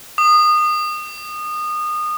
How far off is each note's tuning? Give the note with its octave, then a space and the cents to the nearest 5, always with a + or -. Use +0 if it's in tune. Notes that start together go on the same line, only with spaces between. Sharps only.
D#6 -25